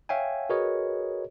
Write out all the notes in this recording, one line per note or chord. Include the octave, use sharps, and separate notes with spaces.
C#5 E5 F5 G5 G#5
F#4 G#4 A#4 B4 C#5 D#5